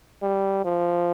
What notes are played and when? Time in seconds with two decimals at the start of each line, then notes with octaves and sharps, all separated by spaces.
0.22 G3
0.65 F3